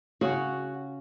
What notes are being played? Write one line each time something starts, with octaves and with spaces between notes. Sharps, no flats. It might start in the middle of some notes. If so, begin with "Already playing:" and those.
C#3 C#4 F#4 F#5